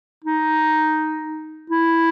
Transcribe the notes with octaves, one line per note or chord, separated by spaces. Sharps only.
D#4
E4